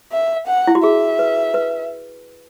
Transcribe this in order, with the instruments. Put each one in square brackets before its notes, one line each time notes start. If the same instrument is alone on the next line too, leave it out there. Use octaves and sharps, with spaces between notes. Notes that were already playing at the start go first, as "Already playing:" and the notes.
[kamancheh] E5
F#5
[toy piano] E4
F#4
[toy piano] G#4 [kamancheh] E5
[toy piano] B4
B4